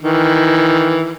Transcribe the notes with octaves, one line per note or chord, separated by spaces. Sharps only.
D#3 E3